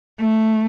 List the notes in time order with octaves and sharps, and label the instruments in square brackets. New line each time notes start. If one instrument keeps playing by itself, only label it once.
[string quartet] A3